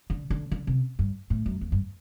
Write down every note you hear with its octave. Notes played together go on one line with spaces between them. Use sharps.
D3
D3
D3
C3
G2
A2
F#2
E2
G2